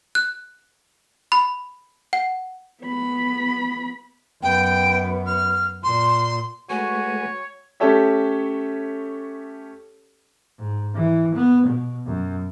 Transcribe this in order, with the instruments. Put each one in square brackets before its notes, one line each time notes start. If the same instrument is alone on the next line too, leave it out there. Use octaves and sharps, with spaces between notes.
[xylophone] F#6
B5
F#5
[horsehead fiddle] B3 B5
[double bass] F#2 B3 [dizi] G5
[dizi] F6
[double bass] A#2 [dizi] C6
[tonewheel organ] G#3 A3 B4 [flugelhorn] F#4 [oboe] C#5 [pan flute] G#5
[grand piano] A3 C#4 G4 A4 C#5 E5
[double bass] G#2
E3
B3
B2
F#2